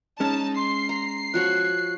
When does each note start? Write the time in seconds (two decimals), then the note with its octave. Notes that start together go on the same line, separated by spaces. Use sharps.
0.20 G#3 C#4 D#4 A5
0.56 C6 C7
0.89 A#5
1.34 F3 F#4 C#5 F#6